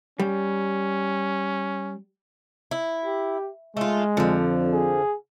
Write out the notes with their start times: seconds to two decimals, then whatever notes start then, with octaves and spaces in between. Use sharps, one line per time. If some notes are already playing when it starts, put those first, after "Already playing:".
0.20 G3 C#4
2.71 E4
3.05 G4
3.77 G#3 A3 F4
4.17 F2 D3 F3
4.73 G#4